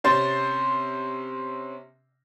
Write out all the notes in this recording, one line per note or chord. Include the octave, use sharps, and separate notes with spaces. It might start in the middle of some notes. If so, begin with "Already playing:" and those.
C3 C#4 C5 C6 A6